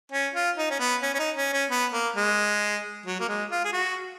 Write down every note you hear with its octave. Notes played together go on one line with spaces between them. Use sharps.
C#4
F4
D#4
C#4
B3
C#4
C#4
D#4
C#4
C#4
B3
A#3
G#3
F#3
A#3
G#3
F4
G#4
F#4